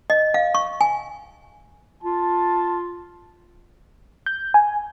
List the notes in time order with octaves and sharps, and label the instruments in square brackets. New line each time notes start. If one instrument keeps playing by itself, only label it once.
[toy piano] D#5
F5
C#6
G#5
[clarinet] F4 [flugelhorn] A5
[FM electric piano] G6
G#5